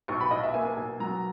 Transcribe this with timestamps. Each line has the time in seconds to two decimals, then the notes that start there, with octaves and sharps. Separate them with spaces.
0.08 B1 C#6
0.21 B5
0.31 B1 D#5
0.43 E5
0.54 A#3 G#5
0.77 B1
1.00 F#3 A#5